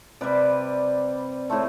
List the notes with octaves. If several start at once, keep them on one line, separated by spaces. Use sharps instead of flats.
C3 G3 B4 D5
A2 E3 A3 A4 C5